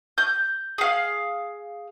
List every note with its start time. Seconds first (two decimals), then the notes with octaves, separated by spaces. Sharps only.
0.18 G6
0.78 G#4 F5